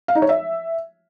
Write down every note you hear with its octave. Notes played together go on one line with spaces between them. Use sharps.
F5
D#4
C#5
E5